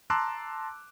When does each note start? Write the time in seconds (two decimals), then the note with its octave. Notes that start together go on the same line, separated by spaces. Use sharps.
0.10 A5 A#5 C6 D6 E6 F#6